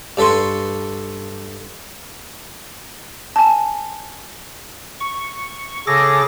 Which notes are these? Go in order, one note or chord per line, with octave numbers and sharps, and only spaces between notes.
G2 A4 B4 C6 C#6
G#5 A5
C#6
C#3 G#4 A4 D6 A#6